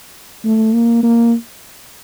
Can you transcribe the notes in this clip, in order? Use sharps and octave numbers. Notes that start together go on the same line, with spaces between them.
A3
A#3
A#3